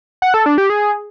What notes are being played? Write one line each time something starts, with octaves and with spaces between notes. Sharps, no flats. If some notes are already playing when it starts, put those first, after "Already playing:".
F#5
A4
D4
G4
G#4